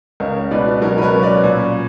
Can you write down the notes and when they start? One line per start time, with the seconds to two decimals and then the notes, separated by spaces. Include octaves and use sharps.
0.20 C#2 A#4 C#5
0.51 B2 B4 D5
0.82 F#3 A#4 C#5
0.98 B4
1.02 A#4 C#5
1.13 C#4
1.23 B4 D5
1.43 A#2